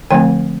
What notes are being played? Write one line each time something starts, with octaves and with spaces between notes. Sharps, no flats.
D3 F3 A3 C4 G5